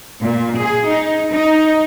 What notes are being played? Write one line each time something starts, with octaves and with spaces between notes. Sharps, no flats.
A#2
G#4
D#4
D#4